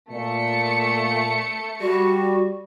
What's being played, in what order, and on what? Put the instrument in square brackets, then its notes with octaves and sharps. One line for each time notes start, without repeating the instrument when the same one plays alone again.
[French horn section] A#2 [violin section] A3 C#7
[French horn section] G3 [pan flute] F#4